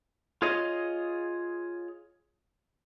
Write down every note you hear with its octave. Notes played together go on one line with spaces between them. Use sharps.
F4 G#4 C#5 D#5